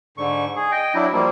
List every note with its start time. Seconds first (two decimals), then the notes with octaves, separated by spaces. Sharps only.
0.18 G#2 D3 C#6
0.56 G#4
0.72 D#5 G5
0.95 F#3 D4 E4
1.13 F3 G3 A#3